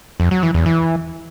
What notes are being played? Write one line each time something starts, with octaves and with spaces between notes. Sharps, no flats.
F2
F#3
E3
E2
E3